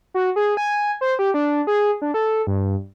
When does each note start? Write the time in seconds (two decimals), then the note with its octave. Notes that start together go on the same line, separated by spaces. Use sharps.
0.14 F#4
0.36 G#4
0.57 G#5
1.01 C5
1.19 G4
1.34 D4
1.67 G#4
2.02 D4
2.14 A4
2.47 G2